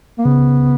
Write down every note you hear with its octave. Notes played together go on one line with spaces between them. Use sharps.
A#3
C#3 B3